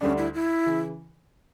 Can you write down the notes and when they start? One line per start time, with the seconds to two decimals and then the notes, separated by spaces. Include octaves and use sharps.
0.01 D2 D3 G3 C#4 D4
0.18 E4
0.34 E4
0.66 C#3 E3